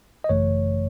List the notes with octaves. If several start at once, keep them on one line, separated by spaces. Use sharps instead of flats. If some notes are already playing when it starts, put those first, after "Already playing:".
D#5
G#1 F#2 C#3 E3 A3 C#5